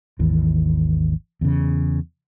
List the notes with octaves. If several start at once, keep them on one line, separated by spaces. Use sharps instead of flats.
G#1 D#2 E3
E2 C#3